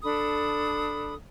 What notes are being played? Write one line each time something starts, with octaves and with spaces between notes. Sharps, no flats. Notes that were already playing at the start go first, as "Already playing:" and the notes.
D4 A4 B5 D#6